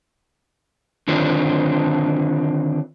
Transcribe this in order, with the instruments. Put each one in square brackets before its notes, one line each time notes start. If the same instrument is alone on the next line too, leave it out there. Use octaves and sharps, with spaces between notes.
[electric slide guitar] D3 D#3 C4 D4 F4